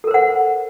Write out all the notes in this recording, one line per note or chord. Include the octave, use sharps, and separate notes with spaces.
A4 A#4 C5 F#5